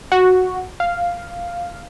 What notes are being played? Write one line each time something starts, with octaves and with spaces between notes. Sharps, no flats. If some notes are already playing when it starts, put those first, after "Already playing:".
F#4
F5